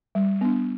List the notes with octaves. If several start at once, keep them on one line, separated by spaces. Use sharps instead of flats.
G3
B3 D4